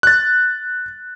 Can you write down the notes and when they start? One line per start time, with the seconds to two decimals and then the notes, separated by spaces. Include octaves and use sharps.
0.03 F#6 A6